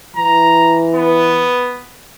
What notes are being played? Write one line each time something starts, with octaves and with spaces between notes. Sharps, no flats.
E3 A#5
B3